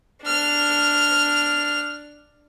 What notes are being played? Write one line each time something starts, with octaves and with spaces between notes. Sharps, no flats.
D4 F6